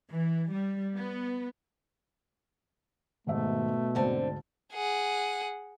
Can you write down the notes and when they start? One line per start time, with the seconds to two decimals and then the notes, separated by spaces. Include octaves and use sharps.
0.11 E3
0.52 G3
0.96 B3
3.27 D#2 G#2 B2 A3 E5
3.95 D2 G#2 D3 C4 A5
4.73 G#4 F#5